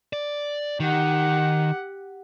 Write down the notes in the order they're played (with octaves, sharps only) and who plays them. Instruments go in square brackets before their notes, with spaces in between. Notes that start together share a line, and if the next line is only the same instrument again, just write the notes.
[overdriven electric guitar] D5
[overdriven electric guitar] D#3 [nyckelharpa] G4 F#5